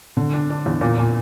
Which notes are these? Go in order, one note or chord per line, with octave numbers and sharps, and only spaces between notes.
D3
D4
D4
E2
A#2
A#2